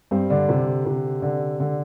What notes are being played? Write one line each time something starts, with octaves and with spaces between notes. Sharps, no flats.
G2 C4
D3 D4
C3
C3
D3
D3